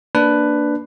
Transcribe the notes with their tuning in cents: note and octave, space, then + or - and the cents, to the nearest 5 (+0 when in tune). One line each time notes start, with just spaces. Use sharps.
A#3 -10 D4 +0 B4 +10